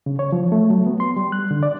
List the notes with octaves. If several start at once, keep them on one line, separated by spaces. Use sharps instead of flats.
C#3
C#5
F3
A3
F#3
B3
C6
G3
F#6
D3
D5